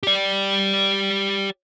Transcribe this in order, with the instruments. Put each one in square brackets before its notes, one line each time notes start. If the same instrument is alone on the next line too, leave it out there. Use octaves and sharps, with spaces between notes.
[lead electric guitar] G4 D5